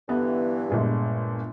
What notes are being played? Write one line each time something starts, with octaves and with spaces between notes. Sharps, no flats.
G2 D3 E3 B3
G1 A#2 G#3